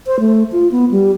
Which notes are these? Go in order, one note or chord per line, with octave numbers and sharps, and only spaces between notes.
C5
A3
F4
B3
G3